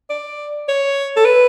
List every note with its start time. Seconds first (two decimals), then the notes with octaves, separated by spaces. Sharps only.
0.10 D5
0.68 C#5
1.16 A4
1.25 B4